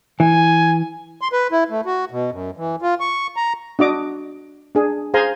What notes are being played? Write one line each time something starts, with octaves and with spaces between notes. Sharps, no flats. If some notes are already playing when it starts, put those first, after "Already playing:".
E3 G#5
C6
B4
E4
A3
F#4
B2
F#2
E3
F4
C#6
A#5
D4 F#4 D#5 D6
D4 G#4
G#4 C5 F5 G#5 A#5 C6